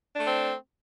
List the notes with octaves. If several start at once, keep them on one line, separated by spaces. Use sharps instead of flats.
A3 C4 D4